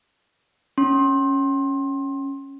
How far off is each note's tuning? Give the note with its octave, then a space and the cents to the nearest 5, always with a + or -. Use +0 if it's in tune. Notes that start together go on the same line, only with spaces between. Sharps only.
C#4 -5 C6 +25